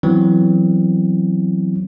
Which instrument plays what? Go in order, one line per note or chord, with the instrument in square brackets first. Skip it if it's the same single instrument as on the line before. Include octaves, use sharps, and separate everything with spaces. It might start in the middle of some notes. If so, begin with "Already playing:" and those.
[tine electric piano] E3 F#3 B3 C4